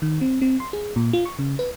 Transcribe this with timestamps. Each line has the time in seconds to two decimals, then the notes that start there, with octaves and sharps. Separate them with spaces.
0.02 D#3
0.21 C4
0.42 C4
0.60 C6
0.73 G#4
0.96 A#2
1.13 F4
1.26 C#6
1.39 C#3
1.59 B4